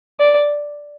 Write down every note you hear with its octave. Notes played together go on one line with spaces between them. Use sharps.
D5